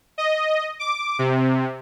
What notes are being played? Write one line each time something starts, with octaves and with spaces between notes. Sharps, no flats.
D#5
D6
C3